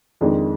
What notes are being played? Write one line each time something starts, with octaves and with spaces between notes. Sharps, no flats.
F2 D#3 G#3 D4